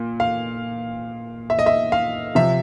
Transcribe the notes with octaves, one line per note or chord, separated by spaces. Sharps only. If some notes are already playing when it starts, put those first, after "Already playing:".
Already playing: A#2
F5
E5
D#5
E5
F5
C3 F3 E5